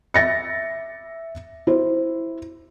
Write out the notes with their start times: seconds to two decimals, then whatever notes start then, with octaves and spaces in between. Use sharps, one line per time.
0.14 E5 A6 A#6 C#7
1.67 E4 C5